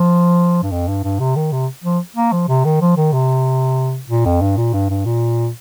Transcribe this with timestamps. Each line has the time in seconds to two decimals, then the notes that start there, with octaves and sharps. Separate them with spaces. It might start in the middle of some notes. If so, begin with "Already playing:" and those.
Already playing: F3
0.63 G2
0.72 F2
0.88 G2
1.04 G2
1.20 C3
1.36 D#3
1.52 C3
1.84 F3
2.16 A#3
2.32 F3
2.49 C3
2.65 D#3
2.81 F3
2.97 D#3
3.13 C3
4.09 A#2
4.25 F2
4.41 G2
4.57 A#2
4.73 G2
4.90 G2
5.05 A#2